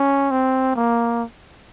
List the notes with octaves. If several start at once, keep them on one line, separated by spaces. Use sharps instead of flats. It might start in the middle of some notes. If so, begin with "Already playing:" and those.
Already playing: C#4
C4
A#3